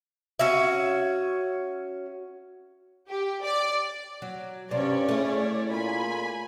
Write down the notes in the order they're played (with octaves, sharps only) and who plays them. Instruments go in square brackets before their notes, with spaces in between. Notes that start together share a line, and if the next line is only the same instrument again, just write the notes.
[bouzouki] C#4 F#4 E5
[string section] G4
D5
[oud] F#3
[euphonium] G2 [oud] C3 [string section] C#4 C#5 D5
[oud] A3 E4 [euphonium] G#4
[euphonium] A#2 [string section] G#5 B5